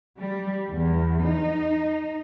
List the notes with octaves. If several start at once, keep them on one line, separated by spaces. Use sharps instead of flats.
G3
E2
D#4